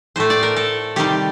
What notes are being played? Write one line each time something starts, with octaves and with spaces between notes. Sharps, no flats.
A2 A3 C5
D5
A#4
A4
C3 D#3 G3 G4